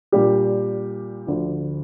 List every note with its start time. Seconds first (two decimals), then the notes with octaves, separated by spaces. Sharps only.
0.12 A#2 G3 D4 G4
1.27 D2 D3 F3